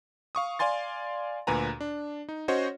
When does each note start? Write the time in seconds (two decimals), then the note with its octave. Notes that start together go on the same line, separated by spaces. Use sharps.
0.35 F5 C#6 D#6
0.59 D5 F5 G#5 C6 A6
1.47 D2 A#2 B4 G#5 A#5
1.81 D4
2.29 D#4
2.48 C#4 F#4 C5 C#5 D#5